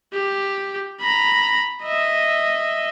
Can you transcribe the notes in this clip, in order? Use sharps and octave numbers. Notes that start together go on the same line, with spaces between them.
G4
A#5 B5
D#5 E5